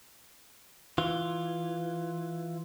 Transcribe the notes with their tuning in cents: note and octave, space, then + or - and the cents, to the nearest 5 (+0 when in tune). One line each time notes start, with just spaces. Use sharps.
E3 +0 F4 +0